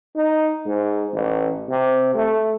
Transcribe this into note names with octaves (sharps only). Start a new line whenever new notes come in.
D#4
G#2
A1
C3
A3